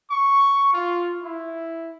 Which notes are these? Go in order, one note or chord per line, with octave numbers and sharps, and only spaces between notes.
C#6
F4
E4